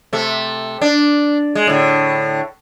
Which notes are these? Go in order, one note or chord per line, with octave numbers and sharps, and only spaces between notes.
C3 A3
D4
G#3
A2 D3